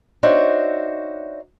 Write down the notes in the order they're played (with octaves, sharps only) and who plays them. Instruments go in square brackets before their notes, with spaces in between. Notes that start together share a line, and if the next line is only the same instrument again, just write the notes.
[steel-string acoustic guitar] D4 D#4 F#4 C5 C#5 E5